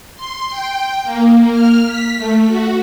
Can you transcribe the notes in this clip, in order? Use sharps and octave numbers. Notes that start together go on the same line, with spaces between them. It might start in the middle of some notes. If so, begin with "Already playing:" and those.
C6
G5
A#3
F6
B6
A3
F#4